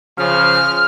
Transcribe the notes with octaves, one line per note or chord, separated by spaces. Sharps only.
C#3 F3 F6